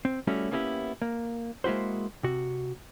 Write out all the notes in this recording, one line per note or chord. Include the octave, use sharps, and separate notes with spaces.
C4
G3 A3 C#4 E4 F#4
A#3 B3 C#4 E4 F#4 G4
A#3
G#3 A#3 E4 F#4 C5
C3 F#4